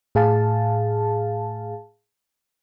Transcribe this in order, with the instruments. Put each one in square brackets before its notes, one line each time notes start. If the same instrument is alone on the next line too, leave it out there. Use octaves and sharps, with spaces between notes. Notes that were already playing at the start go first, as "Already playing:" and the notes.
[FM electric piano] A2 G#4 F5 A5